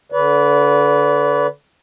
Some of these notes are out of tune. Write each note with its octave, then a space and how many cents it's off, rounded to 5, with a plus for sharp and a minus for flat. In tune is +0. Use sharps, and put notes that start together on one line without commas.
D3 -20 B4 +0 D5 -35